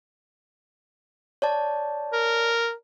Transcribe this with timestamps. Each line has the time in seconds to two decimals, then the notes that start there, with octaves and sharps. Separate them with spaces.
1.42 C#5 D5 A5
2.13 A#4